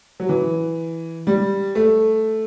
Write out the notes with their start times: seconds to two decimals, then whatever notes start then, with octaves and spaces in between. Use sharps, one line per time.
0.20 F#3
0.29 E3
1.27 G3
1.75 A3